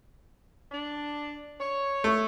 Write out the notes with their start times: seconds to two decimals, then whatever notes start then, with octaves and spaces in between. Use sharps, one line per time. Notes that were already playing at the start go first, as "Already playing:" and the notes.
0.71 D4
1.60 C#5
2.04 A3